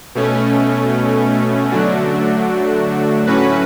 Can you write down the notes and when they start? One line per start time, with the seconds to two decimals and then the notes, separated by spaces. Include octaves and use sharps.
0.15 B2 A3 C#4
1.72 D3 F#3 A3 D4 F#4
3.27 A2 F#3 C#4 F#4 B4